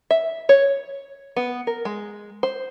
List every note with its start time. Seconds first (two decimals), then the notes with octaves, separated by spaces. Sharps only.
0.11 E5
0.49 C#5
1.36 B3
1.67 A#4
1.85 G#3
2.43 C5